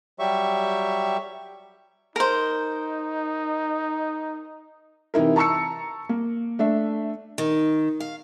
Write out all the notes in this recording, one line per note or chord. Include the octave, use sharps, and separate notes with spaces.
F#3 G3 G4 E5 C#6
D#4 A#4 C5
C3 E3 D#4 E4 A#4
A5 A#5 C#6 E6 C#7
A#3
A3 D4 E5
D#3
F5